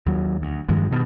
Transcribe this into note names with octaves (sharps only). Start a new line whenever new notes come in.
D#2 F#3
D2
G2 D#3 F3 G#3
G2 B2 D#3